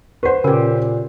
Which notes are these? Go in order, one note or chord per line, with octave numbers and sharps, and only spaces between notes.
G4 B4 C5 F#5
A#2 C#3 G4 A#4